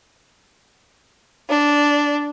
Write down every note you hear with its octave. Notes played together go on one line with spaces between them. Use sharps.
D4